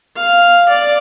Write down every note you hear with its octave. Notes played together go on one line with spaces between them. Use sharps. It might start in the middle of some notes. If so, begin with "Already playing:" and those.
F5
D5